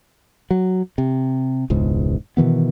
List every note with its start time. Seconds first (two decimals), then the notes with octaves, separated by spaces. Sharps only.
0.51 F#3
0.98 C3
1.70 E1 C#2 G#2
2.37 B2 D#3 E3 B3